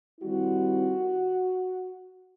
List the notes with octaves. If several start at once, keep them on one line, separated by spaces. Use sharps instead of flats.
D#3 G3 C4 E4 F#4